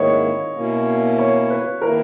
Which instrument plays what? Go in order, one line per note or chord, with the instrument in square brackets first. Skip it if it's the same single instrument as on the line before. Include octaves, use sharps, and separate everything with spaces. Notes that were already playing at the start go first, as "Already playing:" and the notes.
Already playing: [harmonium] G#2 D#3 A#3 E4 [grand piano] C#5 D#5
[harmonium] B2 A#3 C#4 E4
[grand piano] C#5
B4
[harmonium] D#3 A#3 E4 [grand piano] A#4